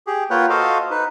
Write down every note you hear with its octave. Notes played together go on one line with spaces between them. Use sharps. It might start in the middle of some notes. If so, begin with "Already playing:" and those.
G4 G#4
A#3 F4 B4 C#5 F#5 G5
F#4 A4 C5 D#5 F5
D#4 B4